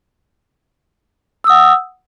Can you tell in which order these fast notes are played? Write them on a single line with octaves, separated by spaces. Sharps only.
E6 D#6 F#5